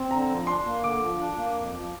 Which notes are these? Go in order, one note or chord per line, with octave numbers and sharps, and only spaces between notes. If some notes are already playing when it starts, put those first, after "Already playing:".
Already playing: C4
D3 A#5
F3
D4 C6
A#3
D3 D6
F3
D4
A#3
F2
F3